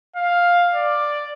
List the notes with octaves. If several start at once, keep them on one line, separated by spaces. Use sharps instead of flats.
F5
D5